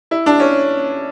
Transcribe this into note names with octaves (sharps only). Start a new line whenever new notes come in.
E4
D4
C#4